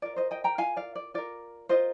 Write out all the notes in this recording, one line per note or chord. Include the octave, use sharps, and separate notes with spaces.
F4 A#4 D5
C5 D#5
D#5 G5
G5 A#5
F4 A#4 F5 G#5
D5 F5
D5
F4 A#4 D5
F4 A#4 C5 D#5